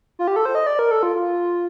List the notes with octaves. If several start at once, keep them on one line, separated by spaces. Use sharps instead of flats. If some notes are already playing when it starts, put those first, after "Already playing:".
F4
G4
A4
C5
D#5
D5
A#4
A4
F4
F4